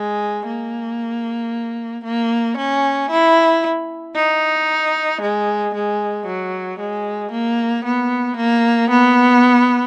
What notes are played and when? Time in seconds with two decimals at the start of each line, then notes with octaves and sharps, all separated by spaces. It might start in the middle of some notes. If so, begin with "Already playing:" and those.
Already playing: G#3
0.47 A#3
2.04 A#3
2.58 C#4
3.11 E4
4.16 D#4
5.22 G#3
5.75 G#3
6.26 F#3
6.79 G#3
7.31 A#3
7.85 B3
8.37 A#3
8.90 B3